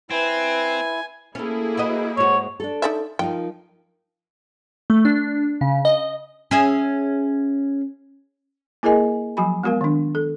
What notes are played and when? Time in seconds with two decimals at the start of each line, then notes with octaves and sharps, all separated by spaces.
0.11 C4 E4 B4 G#5
1.35 A3 A#3 C#4 E4 G#4
1.77 F#4 B4 D#5
2.17 G#2 F#4 C#5
2.60 D4 A4
2.82 D#4 D5 E5
3.19 F3 D#4 A#4 G5
4.90 A3
5.05 D4
5.61 C#3
5.85 D#5
6.51 C#4 G#4 E5
8.83 A#3 E4 G#4 A#4 D#5 G#5
9.37 F3 F#3 F#4 G#5 B5
9.63 G#3 B3 F#4 A#4 F5
9.81 D#3 D4
10.15 A4